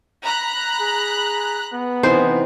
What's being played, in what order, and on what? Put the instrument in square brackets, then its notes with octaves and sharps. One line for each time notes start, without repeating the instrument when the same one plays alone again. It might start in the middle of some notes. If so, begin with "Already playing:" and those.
[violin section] A#5 B5 F#6
[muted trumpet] G#4
B3
[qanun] C3 E3 D#4 [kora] C5